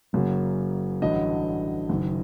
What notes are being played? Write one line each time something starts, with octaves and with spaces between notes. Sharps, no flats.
F#1 F#2 C#3 F#3 A#3
A1 G2 D3 F#3 D#5
F#1 F#2 D#3 F#3